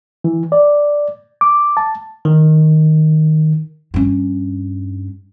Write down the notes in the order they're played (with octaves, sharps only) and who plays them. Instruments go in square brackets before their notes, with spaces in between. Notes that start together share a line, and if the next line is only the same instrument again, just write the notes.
[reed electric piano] E3
D5
D6
A5
[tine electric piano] D#3
[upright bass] G2 C#4